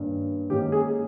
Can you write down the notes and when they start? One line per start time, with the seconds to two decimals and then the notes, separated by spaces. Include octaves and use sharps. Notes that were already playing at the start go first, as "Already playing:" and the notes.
Already playing: G2 D#3 A#3 C#4
0.50 G#2 D#3 A#3 C#4 G4
0.72 G#4